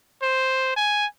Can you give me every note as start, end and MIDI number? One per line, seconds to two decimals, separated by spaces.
0.22 0.74 72
0.76 1.06 80